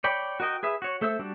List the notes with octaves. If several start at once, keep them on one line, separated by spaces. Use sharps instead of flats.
C#5 D5 G5 B5
F#4 A#4 D#5 G5
G#4 B4 E5
F#4 C#5
A3 A4 C5 E5 E6
G3 D4 F#4